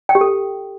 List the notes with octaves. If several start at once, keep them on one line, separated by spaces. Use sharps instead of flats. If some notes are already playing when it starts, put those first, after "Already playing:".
G5
G4
A4